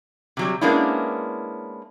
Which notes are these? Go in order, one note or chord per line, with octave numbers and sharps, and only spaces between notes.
C3 F#3 G3
G#3 A#3 B3 C#4 D4 E4